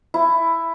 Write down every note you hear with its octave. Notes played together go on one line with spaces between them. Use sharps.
E4